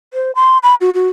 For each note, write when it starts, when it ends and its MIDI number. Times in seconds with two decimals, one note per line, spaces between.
0.14 0.31 72
0.35 0.58 84
0.63 0.75 83
0.81 0.90 66
0.94 1.09 66